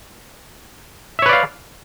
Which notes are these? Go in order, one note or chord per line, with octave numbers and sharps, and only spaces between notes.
B4 C#5 D5 E5 F5